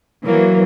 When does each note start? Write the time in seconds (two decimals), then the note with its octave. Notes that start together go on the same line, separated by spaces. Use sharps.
0.24 E3 F#3 A#3